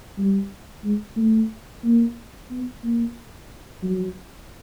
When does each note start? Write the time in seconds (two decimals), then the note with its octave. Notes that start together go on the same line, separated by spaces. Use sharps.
0.18 G3
0.84 G#3
1.17 A3
1.84 A#3
2.50 B3
2.83 A#3
3.83 F#3